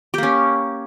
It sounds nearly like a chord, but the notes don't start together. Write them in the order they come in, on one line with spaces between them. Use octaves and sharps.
G4 A#3 C#4